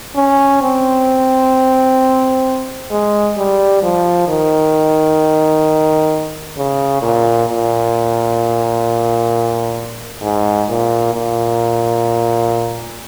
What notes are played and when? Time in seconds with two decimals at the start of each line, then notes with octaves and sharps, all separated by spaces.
0.16 C#4
0.62 C4
2.91 G#3
3.37 G3
3.83 F3
4.28 D#3
6.57 C#3
7.02 A#2
7.49 A#2
10.23 G#2
10.69 A#2
11.14 A#2